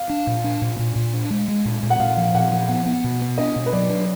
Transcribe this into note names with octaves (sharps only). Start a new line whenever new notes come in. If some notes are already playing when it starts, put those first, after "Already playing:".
Already playing: F5
D4
A#2
D4
A#2
A#2
A#2
D4
G#3
G#3
A#2
A#2
F#5
A#2 F5
F3
A#2 F#5
F3
B3 F#5
B3
B2
B3
D4 D#5
B2
B4
F#3 D5
D4